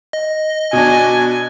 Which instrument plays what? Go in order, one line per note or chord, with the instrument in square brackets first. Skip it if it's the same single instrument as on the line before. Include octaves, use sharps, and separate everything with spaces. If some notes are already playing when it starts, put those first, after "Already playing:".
[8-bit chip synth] D#5
[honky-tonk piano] B2 D4 [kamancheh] G#5